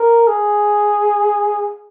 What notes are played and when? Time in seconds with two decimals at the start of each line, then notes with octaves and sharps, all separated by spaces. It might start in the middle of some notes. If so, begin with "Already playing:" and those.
Already playing: A#4
0.27 G#4